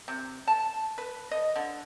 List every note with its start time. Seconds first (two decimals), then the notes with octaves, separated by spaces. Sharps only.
0.08 C3
0.48 A5
0.98 B4
1.31 D#5
1.56 D3